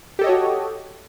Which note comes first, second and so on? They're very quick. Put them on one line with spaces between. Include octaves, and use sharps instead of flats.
G4 A4 D#5 C#5 F#4